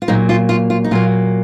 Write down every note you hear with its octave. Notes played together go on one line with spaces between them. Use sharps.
F4
A#2 F#3 A#3 D#4
F4
F4
F4
D#4
A#2 F#3 A#3 F4